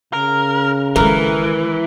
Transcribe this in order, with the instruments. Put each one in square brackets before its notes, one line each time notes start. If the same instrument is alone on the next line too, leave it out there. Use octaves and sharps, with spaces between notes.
[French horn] C#3 [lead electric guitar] A#4
[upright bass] D#3 G#3 [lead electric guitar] E3 [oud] A#4